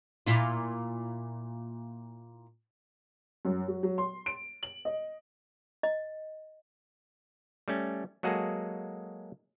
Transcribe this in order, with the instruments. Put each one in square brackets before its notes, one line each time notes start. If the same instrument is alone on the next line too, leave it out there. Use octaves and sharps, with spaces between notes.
[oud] A#2 E4 F4
[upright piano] F#2
F#3
F#3
C6
D7
F#7
D#5
[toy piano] D#5
[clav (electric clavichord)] G3 A3 C#4
F#3 G#3 A#3 F#4 G#4 A4